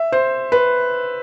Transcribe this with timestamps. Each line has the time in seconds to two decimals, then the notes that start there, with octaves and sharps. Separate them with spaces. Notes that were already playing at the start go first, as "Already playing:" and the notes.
Already playing: E5
0.12 C5
0.52 B4